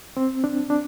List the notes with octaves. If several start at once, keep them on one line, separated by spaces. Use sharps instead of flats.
C4
D4
D4